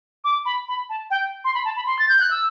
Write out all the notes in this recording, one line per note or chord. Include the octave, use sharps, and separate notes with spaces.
D6
B5
B5
A5
G5
C6
B5
A5
B5
C6
A6
G6
F#6
E6